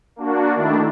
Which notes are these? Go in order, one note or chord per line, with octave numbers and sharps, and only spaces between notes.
A#3 D4 F#4
D#3 A3 D4 E4